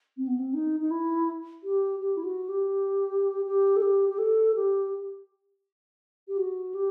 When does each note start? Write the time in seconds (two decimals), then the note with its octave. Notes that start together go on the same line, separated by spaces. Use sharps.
0.17 C4
0.27 B3
0.39 C4
0.54 D#4
0.80 D#4
0.91 E4
1.63 G4
2.00 G4
2.17 E4
2.24 F#4
2.49 G4
3.45 G4
3.76 A4
3.82 G4
4.09 G4
4.18 A4
4.55 G4
6.28 G4
6.37 F#4
6.74 G4